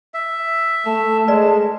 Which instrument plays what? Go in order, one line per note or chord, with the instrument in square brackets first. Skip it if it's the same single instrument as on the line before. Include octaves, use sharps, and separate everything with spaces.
[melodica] E5
[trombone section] A3 [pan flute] A5
[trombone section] G#3 [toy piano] B4 D5